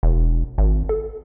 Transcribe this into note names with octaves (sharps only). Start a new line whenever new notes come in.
E1
G#1
A4